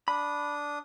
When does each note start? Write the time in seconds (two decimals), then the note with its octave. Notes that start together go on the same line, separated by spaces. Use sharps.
0.08 D4 B5 D#6